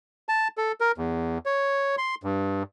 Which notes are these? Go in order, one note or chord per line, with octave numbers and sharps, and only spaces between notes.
A5
A4
A#4
E2
C#5
C6
G2